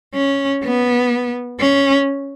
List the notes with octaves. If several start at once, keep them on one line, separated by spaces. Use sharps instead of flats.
C#4
B3
C#4